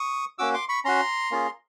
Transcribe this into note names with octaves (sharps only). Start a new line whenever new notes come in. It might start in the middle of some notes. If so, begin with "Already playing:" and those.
Already playing: C#6 D#6
A#3 C#4 F#4 D6 E6
C6 D6
B5 C#6
C#4 F#4 A#5 C6
A#3 C#4 F4 G#4